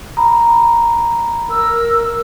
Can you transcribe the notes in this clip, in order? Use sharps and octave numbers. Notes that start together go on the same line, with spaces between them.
A#5 B5
A#4 E6